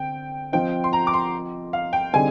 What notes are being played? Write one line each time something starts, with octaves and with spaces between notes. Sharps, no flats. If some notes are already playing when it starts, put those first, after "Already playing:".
Already playing: D3 C4 G5
F3 C4 F4 C5 D#5 G5
C6
A#5
D6
C6
F5
G5
D3 G3 C4 D#4 G#4 G#5